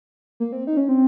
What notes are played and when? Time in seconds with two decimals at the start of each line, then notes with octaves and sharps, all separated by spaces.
0.40 A#3
0.52 C4
0.67 D#4
0.77 C#4
0.89 C4